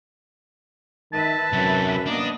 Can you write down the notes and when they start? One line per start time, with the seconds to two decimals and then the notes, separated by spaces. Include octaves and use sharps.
1.13 D#3 B4 E5 A5
1.53 F#2 C3 F#3
2.06 A#3 B3 D4 D#5